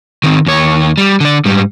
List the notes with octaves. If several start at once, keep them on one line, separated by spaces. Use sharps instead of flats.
D#3 C4
D#2 C#5
G3
D3 D5
G#2 G3